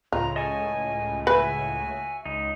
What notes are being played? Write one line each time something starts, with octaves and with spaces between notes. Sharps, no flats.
C#2 A2 C#3 F4 A#5
D#5 G#5 A5 C#6
F#4 B4 E5 G#5
C#2 D#4